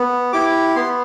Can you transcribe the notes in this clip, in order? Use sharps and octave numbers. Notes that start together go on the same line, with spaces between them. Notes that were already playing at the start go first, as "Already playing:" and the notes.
Already playing: B3
E4 G4 D6
B3 C6